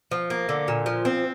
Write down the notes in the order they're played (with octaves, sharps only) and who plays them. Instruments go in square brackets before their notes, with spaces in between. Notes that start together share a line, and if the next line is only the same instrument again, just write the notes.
[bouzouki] F3
A#3
D3
A#2
F3
C4